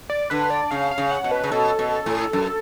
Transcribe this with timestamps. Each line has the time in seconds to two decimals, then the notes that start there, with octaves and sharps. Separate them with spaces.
0.10 D5
0.30 D3 B4
0.50 D5
0.71 C#3 F5
0.91 F5
0.98 C#3
1.11 F#5
1.24 B2
1.31 B4
1.44 C#3
1.52 B2 A4
1.79 B2
2.06 A2
2.33 F#2